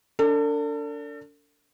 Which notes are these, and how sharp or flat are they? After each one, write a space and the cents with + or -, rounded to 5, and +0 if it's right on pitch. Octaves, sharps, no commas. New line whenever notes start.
D4 -25 A4 +40